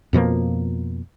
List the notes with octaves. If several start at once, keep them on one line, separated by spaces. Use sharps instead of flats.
F2 B2 F3 A#3